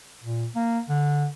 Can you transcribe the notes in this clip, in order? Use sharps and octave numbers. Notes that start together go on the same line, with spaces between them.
A#2
A#3
D3